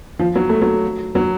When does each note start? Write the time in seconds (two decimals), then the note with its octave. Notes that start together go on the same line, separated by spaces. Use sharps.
0.19 F3
0.35 F#3
0.49 A3
0.62 F#3
1.15 F#3